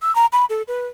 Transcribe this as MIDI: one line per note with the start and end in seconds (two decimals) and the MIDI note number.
0.02 0.14 88
0.15 0.26 82
0.32 0.45 83
0.50 0.62 69
0.68 0.87 71